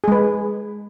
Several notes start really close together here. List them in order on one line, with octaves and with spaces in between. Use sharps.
G#4 G#3 B4